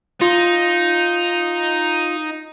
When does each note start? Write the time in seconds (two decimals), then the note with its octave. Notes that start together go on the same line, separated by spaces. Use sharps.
0.21 D#4 F4